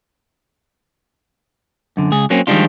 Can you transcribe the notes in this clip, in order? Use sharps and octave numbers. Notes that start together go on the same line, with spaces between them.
F#2 D3
C#2 G#4
F#3 A#3 C4 C#4
D#3 F3 G3 G#3 D4 F4